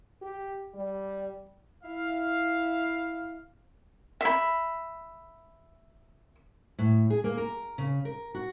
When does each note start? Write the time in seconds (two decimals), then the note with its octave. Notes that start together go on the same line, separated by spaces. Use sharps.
0.22 G4
0.75 G3
1.84 E4 F5
4.21 E5 B5
6.79 A2
7.10 G#4
7.24 A#3
7.37 A#4
7.78 C#3
8.05 A#4
8.34 F#4